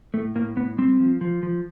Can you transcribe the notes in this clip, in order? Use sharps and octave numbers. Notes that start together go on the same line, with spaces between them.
A2 A3
A2 A#3
A2 B3
G3 C4
F3
F3
F3